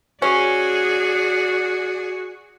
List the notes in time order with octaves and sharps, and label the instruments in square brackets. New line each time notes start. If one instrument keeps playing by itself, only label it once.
[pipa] C#4 [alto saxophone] F#4 [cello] G#4 D5